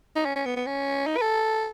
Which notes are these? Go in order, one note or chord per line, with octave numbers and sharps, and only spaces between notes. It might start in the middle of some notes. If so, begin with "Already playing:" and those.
D#4
C#4
C#4
B3
B3
C#4
D#4
B4
A4